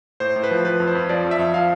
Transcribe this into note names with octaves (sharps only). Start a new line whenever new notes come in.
A2 C5
A2
B4
F3
F3 B4
F2
C5
F2
F3 D5
F2
E5
F2
F3 F5